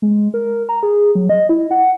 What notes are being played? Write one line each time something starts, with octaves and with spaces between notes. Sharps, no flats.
G#3
A#4
A#5
G#4
F#3
D#5
E4
F#5